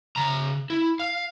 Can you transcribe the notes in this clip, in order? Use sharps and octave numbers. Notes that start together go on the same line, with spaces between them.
C#3 A#5
E4
F5